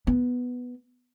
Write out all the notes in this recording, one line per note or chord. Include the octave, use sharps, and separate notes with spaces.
B3